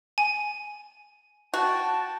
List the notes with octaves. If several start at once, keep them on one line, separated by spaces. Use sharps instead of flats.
G#5
F#4 G5 A5